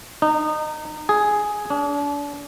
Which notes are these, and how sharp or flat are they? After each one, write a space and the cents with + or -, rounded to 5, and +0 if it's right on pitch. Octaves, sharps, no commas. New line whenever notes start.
D#4 -25
G#4 +5
D4 -35